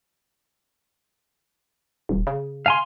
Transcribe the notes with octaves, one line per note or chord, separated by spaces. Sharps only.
D#1
C#3
F5 G#5 C6